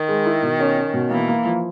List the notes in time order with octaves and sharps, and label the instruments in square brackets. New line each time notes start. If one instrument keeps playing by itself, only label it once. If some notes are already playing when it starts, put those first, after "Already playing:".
Already playing: [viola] D#3
[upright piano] G#3
E4
B2
C#4
C#4
B2
[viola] E3 [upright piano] A#3
[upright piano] A#3
F3